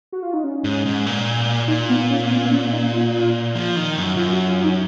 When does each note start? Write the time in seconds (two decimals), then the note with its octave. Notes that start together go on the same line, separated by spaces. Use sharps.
0.12 F#4
0.23 F4
0.34 D#4
0.44 C#4
0.64 G#2
0.86 G#2
1.06 A#2
1.68 A#2 D#4
1.89 B3
2.10 C#4
2.31 B3
2.51 C#4
2.72 D#4
2.93 F4
3.55 F3
3.76 D#3
3.97 F#2
4.17 F#2 F4
4.33 F#4
4.48 F4
4.64 D#4